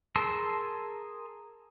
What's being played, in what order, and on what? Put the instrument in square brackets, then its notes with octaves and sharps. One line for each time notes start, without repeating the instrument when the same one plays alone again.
[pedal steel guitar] G#4 A#4 A5 C6 E6